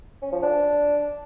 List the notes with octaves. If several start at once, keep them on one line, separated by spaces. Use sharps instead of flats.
C#4
F3
D4